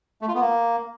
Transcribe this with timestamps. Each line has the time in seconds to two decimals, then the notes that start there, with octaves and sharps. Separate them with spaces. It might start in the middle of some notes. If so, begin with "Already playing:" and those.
0.21 A3
0.28 F4
0.35 B3
0.41 A#3